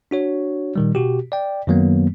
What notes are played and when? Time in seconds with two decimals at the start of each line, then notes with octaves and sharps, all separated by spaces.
0.11 D4 F#4 C#5
0.76 A#2 D#3 G3
0.95 B2 F#4 G4
1.32 D5 G5
1.67 F#2 D#3 F#3 A#3 B3